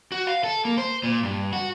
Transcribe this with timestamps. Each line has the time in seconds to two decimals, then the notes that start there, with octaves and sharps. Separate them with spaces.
0.12 F#4
0.27 F5
0.44 A4
0.65 A#3
0.78 C5
1.03 A#2
1.23 G2
1.53 F#4